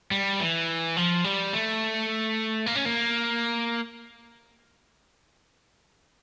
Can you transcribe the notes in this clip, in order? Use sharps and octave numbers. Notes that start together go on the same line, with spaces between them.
G3
E3
F3
G3
A3
A#3
C#4
A#3